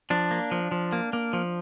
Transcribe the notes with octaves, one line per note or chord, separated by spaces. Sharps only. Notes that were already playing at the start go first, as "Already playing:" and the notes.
F3 D4
A#3
F3
F3
A#3
A#3
F3